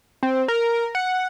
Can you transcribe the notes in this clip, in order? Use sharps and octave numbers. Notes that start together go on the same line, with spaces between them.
C4
A#4
F#5